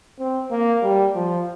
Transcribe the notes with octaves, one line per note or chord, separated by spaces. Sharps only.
C4
A#3
G3
F3